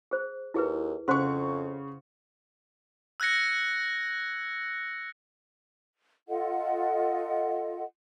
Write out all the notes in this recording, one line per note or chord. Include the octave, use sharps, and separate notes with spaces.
G#4 C5
D#2 E4 G#4 B4
F2 C#3 C5 F#5 C6 C#6
E6 F#6 G#6 A#6 C#7
F4 A4 D#5 F#5